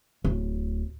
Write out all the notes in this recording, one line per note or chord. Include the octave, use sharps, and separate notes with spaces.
D1